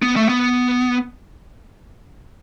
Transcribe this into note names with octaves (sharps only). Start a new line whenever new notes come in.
B3
A3
B3